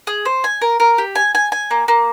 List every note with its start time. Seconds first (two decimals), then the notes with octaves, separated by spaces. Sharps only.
0.07 G#4
0.25 C5
0.44 G#5
0.62 A#4
0.80 A#4
0.98 G4
1.15 G#5
1.35 G#5
1.52 G#5
1.71 A#3
1.88 A#3